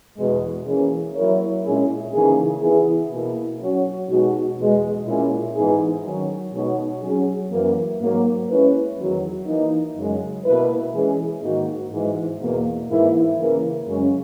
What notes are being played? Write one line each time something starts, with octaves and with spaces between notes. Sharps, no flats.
E2 B2 G#3
E3 A#3 C#4 G#4
F#3 A#3 E4 A#4 C#5
A#2 G#3 C#4 E4 G#4
C#3 E3 A#3 D#4 G#4
E3 B3 E4 G#4
B2 A#3 E4
F#3 C#4 F#4 C#5
B2 G#3 D#4 F#4
E2 B2 G#3
A#2 G#3 C#4 E4 G#4
G#2 E3 B3 D#4 G#4
D#3 F#3 C#4
B2 G#3 D#4 F#4 C#5
F#3 C#4 G#4
F#2 E3 A#3
G#2 F#3 A#3
G#3 C#4 E4 B4
E2 D#3 F#3
E3 A#3 D#4
F#2 C#3 G#3
B2 A#3 E4 B4
E3 G#3 C#4 G#4
G#2 D#3 A#3 D#4 F#4
G#2 E3 G#3
E2 B2 A#3
G#2 E3 A#3 E4
C#3 E3 A#3 E4 A#4
F#2 C#3 G#3 C#4